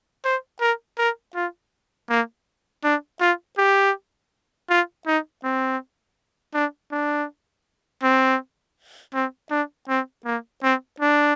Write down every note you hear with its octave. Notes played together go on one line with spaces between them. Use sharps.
C5
A#4
A#4
F4
A#3
D4
F4
G4
F4
D#4
C4
D4
D4
C4
C4
D4
C4
A#3
C4
D4